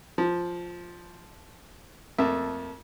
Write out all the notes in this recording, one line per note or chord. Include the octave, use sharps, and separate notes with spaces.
F3
F2 A3 A#3 E5